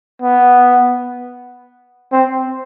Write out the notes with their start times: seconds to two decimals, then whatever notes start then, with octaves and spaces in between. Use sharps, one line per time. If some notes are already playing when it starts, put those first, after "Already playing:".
0.22 B3
2.12 C4